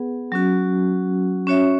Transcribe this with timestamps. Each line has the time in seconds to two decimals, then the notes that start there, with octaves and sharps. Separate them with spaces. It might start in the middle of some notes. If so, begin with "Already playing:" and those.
Already playing: B3 G#4 B4 F#5
0.32 F#3 C#4 F#4
1.47 C#4 F#4 C#5 E5